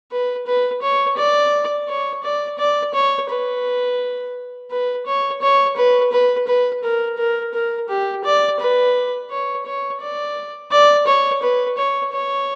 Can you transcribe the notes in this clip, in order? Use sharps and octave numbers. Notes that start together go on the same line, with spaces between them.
B4
B4
C#5
D5
C#5
D5
D5
C#5
B4
B4
C#5
C#5
B4
B4
B4
A#4
A#4
A#4
G4
D5
B4
C#5
C#5
D5
D5
C#5
B4
C#5
C#5